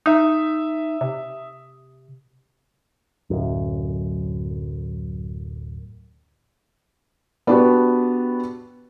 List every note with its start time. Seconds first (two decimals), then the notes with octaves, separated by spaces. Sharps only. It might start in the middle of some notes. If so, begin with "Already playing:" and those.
0.06 D#4 E5 D#6
1.01 C3
3.30 D1 F#2
7.47 B3 D4 F#4 G4 B4